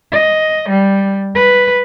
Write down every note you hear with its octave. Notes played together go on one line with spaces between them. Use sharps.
D#5
G3
B4